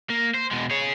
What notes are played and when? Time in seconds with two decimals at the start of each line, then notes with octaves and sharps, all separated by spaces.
0.10 A#3
0.34 C5
0.51 B2 G#3
0.71 G#4 C#5